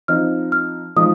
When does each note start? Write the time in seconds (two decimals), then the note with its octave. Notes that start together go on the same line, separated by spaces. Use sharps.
0.08 F3 C4 D#4 F6
0.52 F6
0.96 F3 G#3 D#4 D#6